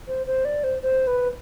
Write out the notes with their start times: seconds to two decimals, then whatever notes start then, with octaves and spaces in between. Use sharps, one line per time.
0.08 C5
0.27 C5
0.45 D5
0.64 C5
0.83 C5
1.07 B4